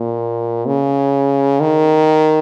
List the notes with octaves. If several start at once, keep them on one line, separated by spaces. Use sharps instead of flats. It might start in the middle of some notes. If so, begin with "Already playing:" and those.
Already playing: A#2
C#3
D#3